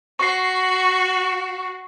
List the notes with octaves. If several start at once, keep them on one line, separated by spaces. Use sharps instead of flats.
F#4 C#6 C7